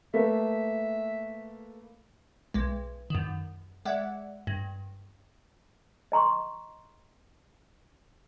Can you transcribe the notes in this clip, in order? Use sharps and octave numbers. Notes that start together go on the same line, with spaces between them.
A3 A#3 B4 E5
B1 G#3
F#2 D#3
G#3 D5 E5 F#5
G2
D#5 A#5 C6 C#6